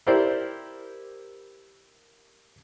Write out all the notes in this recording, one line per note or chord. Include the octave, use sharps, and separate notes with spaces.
E4 G4 A#4 C5 D5